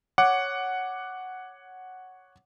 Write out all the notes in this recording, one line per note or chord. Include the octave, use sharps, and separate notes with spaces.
C#5 F#5 D6